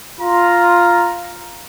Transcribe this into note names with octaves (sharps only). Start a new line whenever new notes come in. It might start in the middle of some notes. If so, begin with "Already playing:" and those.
F4 A#5